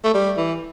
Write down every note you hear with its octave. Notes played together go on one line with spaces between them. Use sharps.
A3
G3
E3